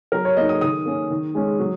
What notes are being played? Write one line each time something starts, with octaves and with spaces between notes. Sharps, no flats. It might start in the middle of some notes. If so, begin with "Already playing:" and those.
F#3 A#4
C#5
A#3 D#4 D#5
D#6
D#3 D#6
A#3 C#4
D#3
G#3 C#4
F#3